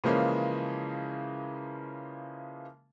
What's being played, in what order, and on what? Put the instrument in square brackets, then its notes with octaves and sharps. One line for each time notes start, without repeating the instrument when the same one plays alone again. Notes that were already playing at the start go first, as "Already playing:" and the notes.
[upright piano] C#3 E3 F3 G#3 A#3 C#4